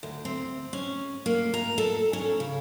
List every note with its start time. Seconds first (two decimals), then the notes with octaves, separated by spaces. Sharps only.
0.03 D2
0.25 C4
0.73 C#4
1.26 A#3
1.54 A#5
1.78 A4
2.13 C#4
2.40 C#3